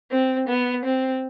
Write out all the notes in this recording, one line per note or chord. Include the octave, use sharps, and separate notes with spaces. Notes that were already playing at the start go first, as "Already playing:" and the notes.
C4
B3
C4